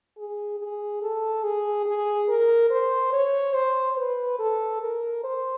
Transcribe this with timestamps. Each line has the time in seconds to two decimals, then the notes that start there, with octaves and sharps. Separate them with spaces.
0.17 G#4
0.59 G#4
1.02 A4
1.43 G#4
1.85 G#4
2.28 A#4
2.70 C5
3.12 C#5
3.54 C5
3.97 B4
4.39 A4
4.81 A#4
5.23 C5